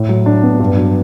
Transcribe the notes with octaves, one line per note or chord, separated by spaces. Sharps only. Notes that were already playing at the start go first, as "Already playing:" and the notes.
Already playing: A2
F#3
D4
B3
G2
F#3